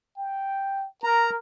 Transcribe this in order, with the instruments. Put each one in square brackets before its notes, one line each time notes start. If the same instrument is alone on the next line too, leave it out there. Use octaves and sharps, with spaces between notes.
[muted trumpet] G5
[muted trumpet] A#4 [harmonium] A#5